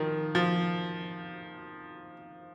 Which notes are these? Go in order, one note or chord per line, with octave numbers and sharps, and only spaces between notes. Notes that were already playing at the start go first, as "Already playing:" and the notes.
Already playing: D#3 F3
F3